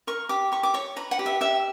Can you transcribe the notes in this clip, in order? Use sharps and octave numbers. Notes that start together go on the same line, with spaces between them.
A#4 C#6
G4 D6
G4 C#6
D6
C#5 C#6
B4 A#5
F#5
G4
E5
G4 E5